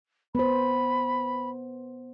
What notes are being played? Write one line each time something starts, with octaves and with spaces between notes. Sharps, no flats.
B3 C5 B5